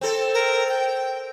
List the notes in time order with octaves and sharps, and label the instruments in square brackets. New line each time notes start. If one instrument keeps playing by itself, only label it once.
[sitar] C4 A4
[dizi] A#4
G5